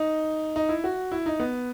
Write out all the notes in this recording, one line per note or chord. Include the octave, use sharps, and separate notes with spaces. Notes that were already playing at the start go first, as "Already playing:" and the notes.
Already playing: D#4
D#4
E4
F#4
E4
D#4
B3